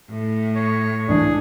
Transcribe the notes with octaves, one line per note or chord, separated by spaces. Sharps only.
A2
C#5
C#2 G#2 E3 D4 G#4